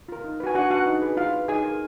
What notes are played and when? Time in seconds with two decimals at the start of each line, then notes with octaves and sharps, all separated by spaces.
0.09 F4 A#4
0.24 D#4
0.40 F#4 B4
0.47 G#5
0.55 D4 F#4 F#5
0.70 F#4 B4 F#5
0.86 D#4
1.02 G#4 B4
1.17 F4 F5
1.32 B4
1.48 D#4 G#4 G#5
1.64 A#4